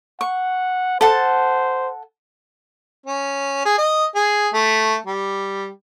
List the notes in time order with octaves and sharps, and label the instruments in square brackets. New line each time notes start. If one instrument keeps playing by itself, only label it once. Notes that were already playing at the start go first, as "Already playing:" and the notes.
[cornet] F#5 [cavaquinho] C#6
[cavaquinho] A4 F#5 A5 [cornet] C5
[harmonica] C#4
G#4
D#5
G#4
A3
G3